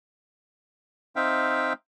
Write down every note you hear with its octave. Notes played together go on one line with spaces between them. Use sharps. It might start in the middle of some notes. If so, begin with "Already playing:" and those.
C4 D#4 E5 F5 G5